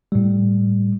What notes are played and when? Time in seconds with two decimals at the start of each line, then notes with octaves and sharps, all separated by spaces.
0.12 A2 G3